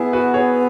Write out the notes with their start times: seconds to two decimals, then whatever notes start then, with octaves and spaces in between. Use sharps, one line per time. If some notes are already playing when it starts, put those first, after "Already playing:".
Already playing: B3 E4 G#4
0.13 F#4 B4
0.34 G#4 C#5